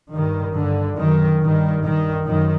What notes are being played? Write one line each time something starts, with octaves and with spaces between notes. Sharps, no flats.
G2 D#3
G2 D3
F#2 D#3
G2 D#3
G2 D#3
F#2 D#3